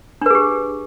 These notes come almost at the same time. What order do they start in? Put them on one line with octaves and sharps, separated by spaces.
D4 B4 G#4 G4